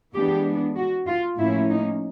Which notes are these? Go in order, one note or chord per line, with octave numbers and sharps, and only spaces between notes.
E3 G#3 B3 D4 G4
F#4
F4
A2 F3 A#3 C#4 E4
D#4